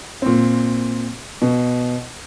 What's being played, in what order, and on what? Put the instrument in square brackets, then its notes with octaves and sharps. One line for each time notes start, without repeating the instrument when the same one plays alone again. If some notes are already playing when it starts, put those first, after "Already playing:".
[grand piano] A#2 C4
B2